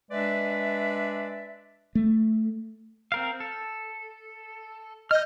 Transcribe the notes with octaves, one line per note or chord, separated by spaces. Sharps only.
G#3 D4 B4 D5 E5
A3
C4 A#4 F5
A4
D#5 F6 G6